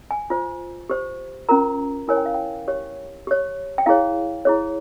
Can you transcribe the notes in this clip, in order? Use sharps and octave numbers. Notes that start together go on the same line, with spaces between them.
G#5
F4 C5
G4 C5
C#4 F4 A#4 A#5
E4 A#4 C#5 G#5
G5
F5
G5
G4 C#5
G4 C#5
G5
E4 G#4 C#5 F5
E4 G#4 C#5